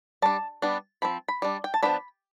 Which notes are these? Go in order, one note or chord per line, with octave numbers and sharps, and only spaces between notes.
G3 D4 A5
G3 B3 D4
F3 C4 B5
B5
G3 D4
G5
A5
F3 B3 D4 B5